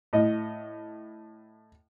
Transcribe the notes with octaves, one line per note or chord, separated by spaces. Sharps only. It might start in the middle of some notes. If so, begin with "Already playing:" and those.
A2 D#5